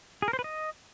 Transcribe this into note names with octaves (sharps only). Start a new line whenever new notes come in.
G#4
A#4
C5
B4
D#5